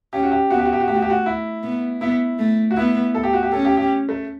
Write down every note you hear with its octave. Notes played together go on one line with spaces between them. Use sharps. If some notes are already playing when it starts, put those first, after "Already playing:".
C#4 G4
F#4
G4
B3 F#4
G4
F#4
G4
F#4
A3 G4
F#4
G4
F#4
E4
B3
B3 E4
A3
F#4
B3 E4
A4
G4
F#4
G4
C#4 A4
G4
G4
A3